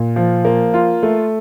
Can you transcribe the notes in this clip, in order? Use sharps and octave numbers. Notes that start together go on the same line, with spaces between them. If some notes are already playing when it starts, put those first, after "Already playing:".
Already playing: A#2
F3
A#3
F4
A3